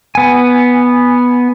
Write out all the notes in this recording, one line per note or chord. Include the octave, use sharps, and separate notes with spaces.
B3 G#5